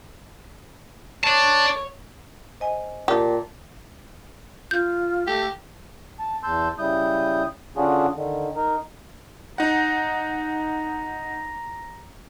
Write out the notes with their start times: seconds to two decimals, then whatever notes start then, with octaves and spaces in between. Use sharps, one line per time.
1.24 C#5 D5 A5
2.60 C5 D#5 G#5
3.08 A#2 G4 A5
4.71 F4 G6
5.27 A3 G4
6.19 A5
6.43 E2 A5 C6 E6 G6
6.78 C#3 G3 E4 D#6 G6
7.77 D3 C#4 D4 F4 F#4 G#4
8.16 D3 D#3
8.56 D#4 A#4
9.58 D#4 F#5 A#5